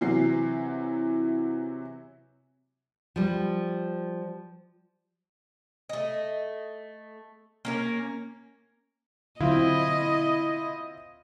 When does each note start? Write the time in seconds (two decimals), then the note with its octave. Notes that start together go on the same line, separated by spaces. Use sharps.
0.01 C3 E3 F#3 C7
3.16 F3 G3
5.89 A3 D#5
7.65 A#3 C#4 A#4
9.41 D3 F#3 C4 E4 F4 D#5